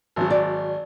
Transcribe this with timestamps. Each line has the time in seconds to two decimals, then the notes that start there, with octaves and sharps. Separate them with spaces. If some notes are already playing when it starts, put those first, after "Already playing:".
0.16 G#1 F#3
0.30 D5